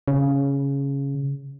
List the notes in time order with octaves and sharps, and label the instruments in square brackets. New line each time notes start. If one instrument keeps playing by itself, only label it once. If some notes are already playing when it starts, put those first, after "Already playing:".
[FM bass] C#3